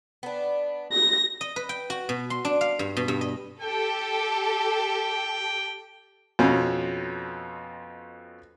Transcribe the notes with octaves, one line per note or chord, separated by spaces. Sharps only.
B3 D4
A#6
D#5
B4
G5
F#4
B2
C6
D4
F5
G2
B2
G2
D#5
G4 A4 G5
F2 B2 C4 C#4